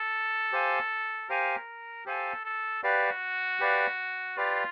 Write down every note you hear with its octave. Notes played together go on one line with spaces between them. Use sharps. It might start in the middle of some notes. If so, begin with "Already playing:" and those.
Already playing: A4
G4 C5 F5 G#5
G4 A#4 C5 F5 G#5
G4 A4 C5 F5 G#5
A4
F#4 G4 B4 D5 F5
G4 B4 D5 F5
F4 G4 B4 D5 F5